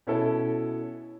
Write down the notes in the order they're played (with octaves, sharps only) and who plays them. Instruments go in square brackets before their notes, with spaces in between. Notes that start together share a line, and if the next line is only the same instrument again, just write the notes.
[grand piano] B2 C#4 E4 A4